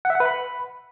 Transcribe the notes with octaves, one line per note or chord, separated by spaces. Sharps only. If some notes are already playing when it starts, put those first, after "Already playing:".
F#5
E5
F#5
B4
B5